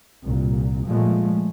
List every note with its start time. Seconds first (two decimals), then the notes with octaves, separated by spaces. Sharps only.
0.24 C2 A#2
0.87 A#2 F3 G#3 A3